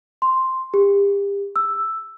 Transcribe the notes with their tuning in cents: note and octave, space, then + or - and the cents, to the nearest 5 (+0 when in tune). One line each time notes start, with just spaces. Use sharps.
C6 +0
G4 +35
E6 +0